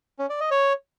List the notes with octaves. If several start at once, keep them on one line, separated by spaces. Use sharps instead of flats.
C#4
D5
D#5
C#5